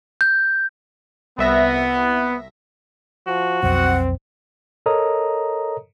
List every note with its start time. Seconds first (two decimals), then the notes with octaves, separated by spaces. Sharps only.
0.21 G6
1.38 C2 B3 E5 A#6
3.27 F3 F#4
3.63 B1 F2 C4 F#5
4.86 A4 A#4 C#5 D#5 A#5 D#6